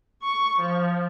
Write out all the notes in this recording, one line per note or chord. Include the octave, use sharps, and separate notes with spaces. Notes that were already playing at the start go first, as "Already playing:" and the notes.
C#6
F3